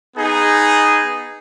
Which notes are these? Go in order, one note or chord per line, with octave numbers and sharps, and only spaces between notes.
B3 D#4 G#4